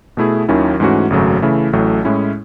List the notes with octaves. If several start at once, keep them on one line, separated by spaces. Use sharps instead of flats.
B2 A3 E4 G#4
D#2 D#3 F#3 C#4 E4
G#2 E3 A3 C#4 F#4
G#1 F#2 C#3 F#3 A3
C#3 E3 A3 E4
A1 A2 F#3 A3
A2 G#3 C#4 E4